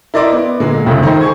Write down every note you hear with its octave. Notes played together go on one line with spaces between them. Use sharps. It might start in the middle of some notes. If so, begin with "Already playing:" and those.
E4 A#4 D5 D#5 C6 D6
B3
A#2 D3 G#3
F1 C#2 G2 E5 D#6
D#3 D#4 A4 C5 D#5
G#4 C#6 G#6